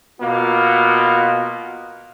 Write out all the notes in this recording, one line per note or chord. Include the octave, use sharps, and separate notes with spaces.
B2 A#3 F4